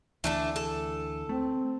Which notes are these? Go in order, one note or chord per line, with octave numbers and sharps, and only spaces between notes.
D2 E3 A3 D4 A4
A4
A3 C4